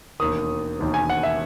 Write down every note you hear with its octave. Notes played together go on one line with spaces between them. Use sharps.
E1 D#2 D#3 D#6
E1 D#2 D#3
G#5
F#5
E5